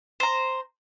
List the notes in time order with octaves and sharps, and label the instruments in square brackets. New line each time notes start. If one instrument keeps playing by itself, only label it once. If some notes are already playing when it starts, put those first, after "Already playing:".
[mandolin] C5 A#5